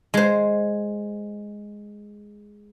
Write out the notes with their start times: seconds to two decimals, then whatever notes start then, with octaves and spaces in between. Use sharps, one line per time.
0.14 G#3 C5